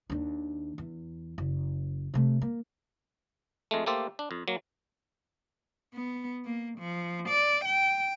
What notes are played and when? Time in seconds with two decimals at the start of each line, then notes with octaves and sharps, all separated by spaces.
0.10 D#2 D4
0.78 E2
1.38 F#1
2.14 C3 A3
2.42 A#3
3.71 F2 G#3 A3
3.86 A3 A#3 G4 A4 C5
4.19 D4
4.31 F2
4.48 F#3 A#3
5.94 B3
6.45 A#3
6.79 F3
7.29 D5
7.65 G5